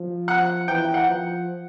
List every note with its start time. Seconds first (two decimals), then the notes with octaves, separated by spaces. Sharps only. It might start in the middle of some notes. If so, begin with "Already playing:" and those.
Already playing: F3
0.28 F#5
0.68 E3 G5
0.94 F#5
1.07 F3